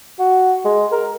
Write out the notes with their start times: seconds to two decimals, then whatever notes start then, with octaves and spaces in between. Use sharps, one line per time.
0.19 F#4
0.65 G#3
0.92 A#4